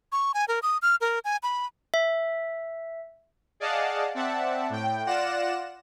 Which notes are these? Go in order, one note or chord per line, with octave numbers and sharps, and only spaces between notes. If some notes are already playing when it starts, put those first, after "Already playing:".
C#6
G#5
A#4
D#6
F6
A#4
G#5
B5
E5
G#4 D5 D#5 F5 F#5 A5
C4 D5 E5 F#5 A5
A2 G5
F4 D5 F#5 F#6 A#6 E7